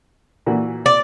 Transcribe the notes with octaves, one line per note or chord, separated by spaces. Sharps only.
A#2 E3 F#4
D5